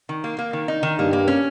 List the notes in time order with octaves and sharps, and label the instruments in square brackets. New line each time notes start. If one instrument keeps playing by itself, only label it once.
[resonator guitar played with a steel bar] D#3
A#3
A#3
D#3
D#4
D#3
[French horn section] G2 [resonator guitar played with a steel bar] A#3
[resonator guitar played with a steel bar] A#3
C#4